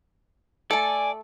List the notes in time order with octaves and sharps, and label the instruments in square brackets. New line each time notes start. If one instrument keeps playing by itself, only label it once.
[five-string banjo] A3 A4 [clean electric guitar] D5 [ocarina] G#5